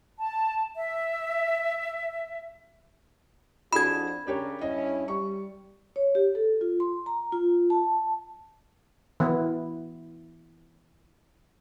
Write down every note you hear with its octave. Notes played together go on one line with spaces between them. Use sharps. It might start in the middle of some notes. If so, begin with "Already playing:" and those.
A5
E5
F2 D4 E4 F#4 G#4 B5 G#6
C#3 C#4 D4 G4 A#4 C#5
G2 C#4 E4 D#5
G3 C#6
C#5
G4
A4
F4
C6
A#5
F4
A5
E3 B3 E4